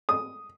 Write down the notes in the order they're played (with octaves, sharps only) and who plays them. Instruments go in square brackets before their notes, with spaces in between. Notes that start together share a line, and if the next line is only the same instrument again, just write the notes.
[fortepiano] D#6